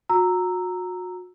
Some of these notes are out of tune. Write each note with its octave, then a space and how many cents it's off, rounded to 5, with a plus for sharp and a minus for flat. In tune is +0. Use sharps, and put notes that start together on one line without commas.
F#4 -35 A#5 -10 E6 +0